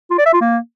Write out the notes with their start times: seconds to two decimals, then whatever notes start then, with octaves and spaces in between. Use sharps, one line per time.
0.11 F4
0.18 D5
0.26 E5
0.34 F4
0.41 A#3